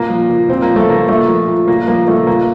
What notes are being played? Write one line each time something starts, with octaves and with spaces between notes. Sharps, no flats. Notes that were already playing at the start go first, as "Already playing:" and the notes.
Already playing: A#2 A#3
F3
A#2
A#2 C4
A#3
F3
A3
A#2 A#3
A#2 A3
F3
A#2
A#2 A#3
F3 A#3
A#2 A3
A#2 A#3